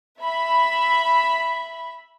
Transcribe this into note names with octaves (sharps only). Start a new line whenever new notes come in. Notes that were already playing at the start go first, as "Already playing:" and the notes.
E5 B5